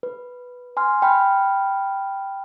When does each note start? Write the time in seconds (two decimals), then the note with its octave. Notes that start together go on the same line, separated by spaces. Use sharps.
0.03 B4
0.77 G#5 C6 F6
1.02 G5 B5 F6